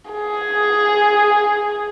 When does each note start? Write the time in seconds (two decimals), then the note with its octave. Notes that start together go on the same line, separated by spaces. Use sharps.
0.11 G#4